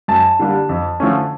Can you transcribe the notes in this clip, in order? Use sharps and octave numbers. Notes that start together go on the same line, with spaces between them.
F#2 A5
D3 G3 A#3 D4
F2
D3 F3 A3 C#4